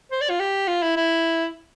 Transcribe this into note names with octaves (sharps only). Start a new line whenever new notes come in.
C5
D5
F4
G4
F4
E4
E4